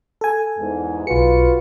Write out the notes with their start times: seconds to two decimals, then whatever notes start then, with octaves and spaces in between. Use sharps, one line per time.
0.21 A4 G#5
0.59 E2 G#2
1.07 B1 F4 F#4 B4 C#7